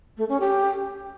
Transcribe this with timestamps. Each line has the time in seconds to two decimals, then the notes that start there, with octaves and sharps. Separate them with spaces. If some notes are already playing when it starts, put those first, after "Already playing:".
0.17 A3
0.29 C#4
0.40 G4